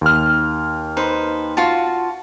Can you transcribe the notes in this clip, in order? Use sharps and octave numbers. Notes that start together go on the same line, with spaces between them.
D#2 F6
D#4 B4 C5
F4 F#4 A5